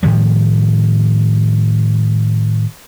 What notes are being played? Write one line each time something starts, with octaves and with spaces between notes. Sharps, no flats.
A2 D#3 F3 G3